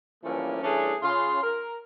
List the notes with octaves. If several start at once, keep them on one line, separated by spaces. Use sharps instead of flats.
G2 E3 F3 A3 A#3 C#4
G2 E3 A3 C#4 D4 G#4
C#3 F4 C6
A#4